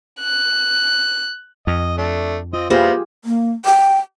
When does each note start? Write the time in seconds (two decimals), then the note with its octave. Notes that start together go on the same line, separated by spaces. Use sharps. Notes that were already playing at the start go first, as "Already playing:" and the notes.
0.20 F#6
1.67 F2 D#5
1.98 A3 D4
2.53 C4 F4 D#5
2.70 G3 A#3 B3 E4 F4 G4 G#4 C5
3.25 A#3
3.65 G5